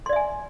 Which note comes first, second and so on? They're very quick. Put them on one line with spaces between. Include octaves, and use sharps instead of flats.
C6 D5 E5 G#5